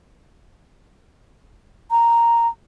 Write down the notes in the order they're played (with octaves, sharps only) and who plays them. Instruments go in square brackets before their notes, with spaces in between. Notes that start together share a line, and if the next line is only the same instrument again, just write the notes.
[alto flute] A#5